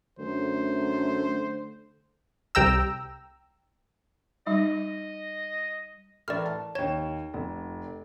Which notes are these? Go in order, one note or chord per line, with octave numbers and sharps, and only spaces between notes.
F#2 D3 A3 C5
C2 G5 A#5 E6
G3 D#4 D#5
A2 E3 A#4 D5 F6
A5
D#2 C#5 E7
F1